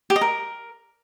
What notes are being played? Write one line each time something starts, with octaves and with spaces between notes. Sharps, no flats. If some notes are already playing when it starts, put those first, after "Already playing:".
G4
D#5
A#4